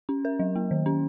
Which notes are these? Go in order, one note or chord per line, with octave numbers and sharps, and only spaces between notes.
C#4
A#4
F#3
A#3
D#3
C#4